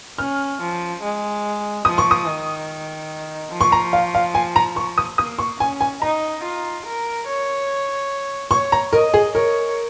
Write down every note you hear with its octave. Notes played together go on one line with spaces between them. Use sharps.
C#4 F6
F3
G#3
F3 D#6
C#6
D#6
D#3
F3
C#6
A#5
F5
F5
G#5
A#5
C#6
D#6
A#3 D#6
C#6
C#4 G#5
G#5
D#4 A#5
F4
A#4
C#5
C#5 C#6
A#5
A#4 D#5
G#4
A#4 C#5